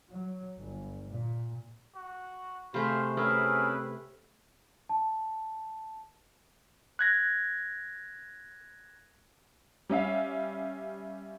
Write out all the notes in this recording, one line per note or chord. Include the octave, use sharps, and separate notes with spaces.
F#3
G1
A#2
F#4
C3 A3 G#4 C5 F5 B5
A3 C4 C#4 E4 G#4 A#4 B4
A5
F#6 G#6 A#6
G3 C#4 E5 F5